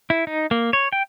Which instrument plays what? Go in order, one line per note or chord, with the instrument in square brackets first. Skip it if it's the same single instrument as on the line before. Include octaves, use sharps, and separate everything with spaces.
[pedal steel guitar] E4
D#4
A#3
C#5
G5